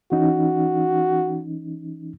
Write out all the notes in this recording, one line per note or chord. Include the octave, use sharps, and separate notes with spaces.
E3 C#4 D#4 F#4